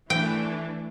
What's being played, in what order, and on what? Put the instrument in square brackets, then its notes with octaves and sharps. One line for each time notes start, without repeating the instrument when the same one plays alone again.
[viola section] E3 A3 D4 [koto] G5